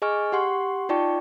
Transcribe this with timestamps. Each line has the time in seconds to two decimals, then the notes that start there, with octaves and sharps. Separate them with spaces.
0.02 G#4 D#5 G#5 C#6 F6
0.32 G4 F#5 C6 C#6
0.89 D#4 F4 D5 G5 A5 C#6